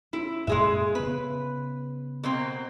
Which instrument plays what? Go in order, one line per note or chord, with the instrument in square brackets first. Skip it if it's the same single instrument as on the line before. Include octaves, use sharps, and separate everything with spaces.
[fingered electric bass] C#4 [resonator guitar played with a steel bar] E4
[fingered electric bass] F#2 A#2 [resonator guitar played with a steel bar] G#3 G#4 E5
[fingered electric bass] C#3 B3 [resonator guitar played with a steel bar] B4
[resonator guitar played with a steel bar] B2 A#3 C4